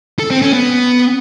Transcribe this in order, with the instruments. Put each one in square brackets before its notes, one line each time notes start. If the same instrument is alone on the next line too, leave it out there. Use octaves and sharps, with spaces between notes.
[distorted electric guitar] A4
C4
C#4
B3